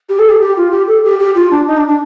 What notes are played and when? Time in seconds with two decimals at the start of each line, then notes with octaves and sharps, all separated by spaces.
0.09 G4
0.19 A4
0.29 G4
0.41 G4
0.57 F4
0.71 G4
0.87 A4
1.04 G4
1.19 G4
1.35 F4
1.51 D4
1.67 D#4
1.77 D4
1.87 D4